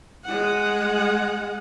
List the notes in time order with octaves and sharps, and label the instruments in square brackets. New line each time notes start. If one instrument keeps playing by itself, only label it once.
[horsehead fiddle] G#3 F#5